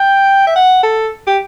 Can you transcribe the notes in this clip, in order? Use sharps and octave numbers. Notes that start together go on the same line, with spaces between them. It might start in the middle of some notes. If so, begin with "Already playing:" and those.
Already playing: G5
E5
F#5
A4
G4